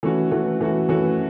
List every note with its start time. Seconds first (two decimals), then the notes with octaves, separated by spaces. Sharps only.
0.03 E3 A3 C#4 F#4
0.31 E3 A3 C#4 F#4
0.60 E3 A3 C#4 F#4
0.89 E3 A3 C#4 F#4